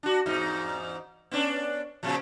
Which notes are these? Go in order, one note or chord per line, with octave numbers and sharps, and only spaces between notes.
D4 F#4
E2 G#2 D#4
B3 C#4 D4
A#2 C#3 F3